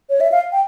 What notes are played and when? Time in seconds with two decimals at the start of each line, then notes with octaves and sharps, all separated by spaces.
0.10 C#5
0.21 E5
0.32 F5
0.52 G5